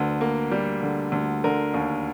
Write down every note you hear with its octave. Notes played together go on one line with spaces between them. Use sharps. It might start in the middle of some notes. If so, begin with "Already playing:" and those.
Already playing: D2 D3 B4
A#3
G3
D3
D2
D3 A#4
D#2